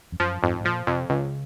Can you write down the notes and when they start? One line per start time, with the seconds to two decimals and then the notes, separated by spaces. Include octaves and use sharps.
0.12 F2
0.20 F#2 F3
0.43 F2 G#2
0.60 G#2
0.65 A#2 F3
0.87 F2 C3
1.10 C#2 C#3